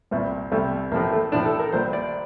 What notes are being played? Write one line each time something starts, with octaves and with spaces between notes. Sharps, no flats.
C2 A#2 G3
C2 C3 G3 A3
A1 A2 F3 A#3
A3
A1 A2 F3 D4
A4
A#4
A#1 A#2 G3 C5
D5